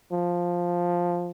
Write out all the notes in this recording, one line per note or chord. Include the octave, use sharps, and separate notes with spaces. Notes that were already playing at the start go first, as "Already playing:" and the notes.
F3